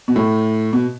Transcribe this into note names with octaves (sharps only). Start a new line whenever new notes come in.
B2
A2
B2